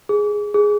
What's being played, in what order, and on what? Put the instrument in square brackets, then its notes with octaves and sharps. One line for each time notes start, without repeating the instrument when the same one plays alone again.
[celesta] G#4
G#4